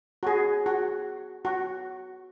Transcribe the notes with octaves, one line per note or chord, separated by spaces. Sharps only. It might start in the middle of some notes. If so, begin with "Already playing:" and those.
F#4
G#4
F#4
F#4